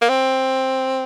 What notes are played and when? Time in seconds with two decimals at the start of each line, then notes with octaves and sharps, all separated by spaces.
0.01 A#3
0.09 C4